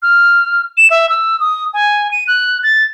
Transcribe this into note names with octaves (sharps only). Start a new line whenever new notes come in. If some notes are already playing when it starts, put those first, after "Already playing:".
F6
E7
E5
E6
D#6
G#5
D#7
F#6
A6